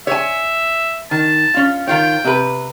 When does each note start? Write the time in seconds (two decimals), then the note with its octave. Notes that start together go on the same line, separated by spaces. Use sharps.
0.07 C#5 E5 G#5
1.11 D#3 A5
1.54 C#4 F4
1.87 D#3 F4 C#5 G5
2.25 C3 B4